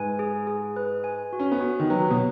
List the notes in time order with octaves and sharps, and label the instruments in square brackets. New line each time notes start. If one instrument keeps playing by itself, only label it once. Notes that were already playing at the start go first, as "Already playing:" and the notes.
Already playing: [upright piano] G#2 [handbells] B4 G#5
[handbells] G#4
G#4
B4
G#5
F#4
[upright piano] C#4
B3
[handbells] F#4
[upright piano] D#3
[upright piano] F#3 [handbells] B4
[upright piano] B2